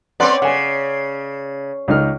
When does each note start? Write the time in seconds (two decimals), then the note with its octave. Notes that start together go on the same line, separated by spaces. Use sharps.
0.20 C4 C#4 B4 D5 F#5 C6
0.42 C#3 F#5 G#5
1.88 C#2 D#4 F6